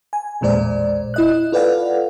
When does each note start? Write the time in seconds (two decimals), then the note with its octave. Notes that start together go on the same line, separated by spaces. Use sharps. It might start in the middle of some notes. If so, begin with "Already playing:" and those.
0.13 G#5
0.41 A1 E2 A#2 G#3 C5 D5
1.14 E4 D#5 F#6
1.52 F4 A4 B4 D5 F5 F#5